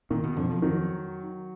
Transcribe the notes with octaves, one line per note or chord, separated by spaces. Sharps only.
A#2 D#3
B2
F2 D3
F3
D#3 F#3